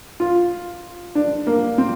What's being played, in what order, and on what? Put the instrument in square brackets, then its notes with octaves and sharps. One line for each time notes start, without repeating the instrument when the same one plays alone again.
[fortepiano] F4
D4
A#3
C4